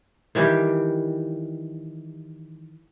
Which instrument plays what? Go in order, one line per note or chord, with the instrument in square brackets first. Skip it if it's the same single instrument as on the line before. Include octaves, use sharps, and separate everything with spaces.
[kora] D#3 E3 G3 G4